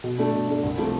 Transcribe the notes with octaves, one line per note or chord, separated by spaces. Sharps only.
B2
A3 D4
B2
A3 D4
C2
C3 F3 A3